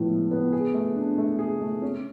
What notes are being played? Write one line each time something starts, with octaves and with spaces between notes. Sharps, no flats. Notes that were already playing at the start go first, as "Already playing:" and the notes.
Already playing: A2 F3 B3
G#3
B3
G#4
A3
D4
A3
G#4
A3
C#4